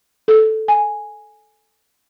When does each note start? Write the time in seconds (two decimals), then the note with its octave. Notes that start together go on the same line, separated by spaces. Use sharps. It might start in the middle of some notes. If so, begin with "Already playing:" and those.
0.28 A4
0.68 G#5